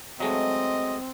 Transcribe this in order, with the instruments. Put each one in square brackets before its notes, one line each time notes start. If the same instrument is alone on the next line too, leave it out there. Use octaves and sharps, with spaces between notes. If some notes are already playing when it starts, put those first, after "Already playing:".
[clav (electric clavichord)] F#3 G#3 A3 [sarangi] C4 [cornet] D#5